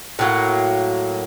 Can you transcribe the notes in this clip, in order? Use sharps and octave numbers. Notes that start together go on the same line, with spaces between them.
A2 F#3 A#3